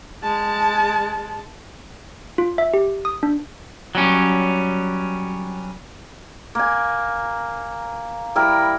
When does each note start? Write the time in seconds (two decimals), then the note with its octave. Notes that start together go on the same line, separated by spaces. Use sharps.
0.23 G#3 A5
2.38 F4
2.58 E5
2.74 G4
3.05 D#6
3.23 D4
3.95 F#3 G3 C#4
6.55 A#3 G#5
8.35 G3 E4 A#4 B5